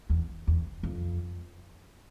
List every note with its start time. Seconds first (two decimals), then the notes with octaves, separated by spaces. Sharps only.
0.10 E2
0.47 E2
0.83 F2